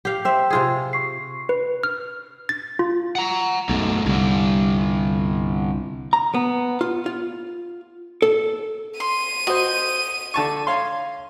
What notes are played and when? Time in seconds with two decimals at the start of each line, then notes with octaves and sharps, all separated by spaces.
0.05 G4 F5
0.25 C4 E5 G5 E6
0.50 C3 F4 G#4
0.93 C#6 C7
1.49 B4
1.83 F6
2.49 A6
2.79 F4
3.15 F#5 A#5
3.69 B1 F#2 G#3 A3
4.06 C2 D3 G3 D4
6.13 A#5
6.34 B3
6.81 F4
7.06 F4
8.22 A4
9.00 C6 D#7
9.47 F#4 C5 D#5
10.34 D3 A5 C#6
10.67 C#5 F5 C6